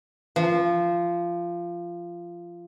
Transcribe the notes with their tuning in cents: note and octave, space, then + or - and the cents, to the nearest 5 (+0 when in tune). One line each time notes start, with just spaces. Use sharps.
F3 -15